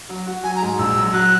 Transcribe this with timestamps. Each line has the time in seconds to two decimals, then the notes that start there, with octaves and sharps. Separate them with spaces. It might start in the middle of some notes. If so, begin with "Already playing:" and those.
0.09 F#3
0.27 F#4
0.43 F#3 G#5
0.55 A#5
0.62 G#2
0.78 A#1 E6
0.96 F#3
1.13 F#3 F#6